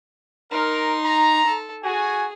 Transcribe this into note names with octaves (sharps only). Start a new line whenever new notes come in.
D#4 A#4 C6
A#5
A4
F#4 G#4 G#5